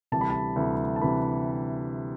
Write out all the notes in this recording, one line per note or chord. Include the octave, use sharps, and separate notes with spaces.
D2 C3 E3 G3 A5
B5
A5
D2 C3 E3 G3
A5
C3 E3 G3 B5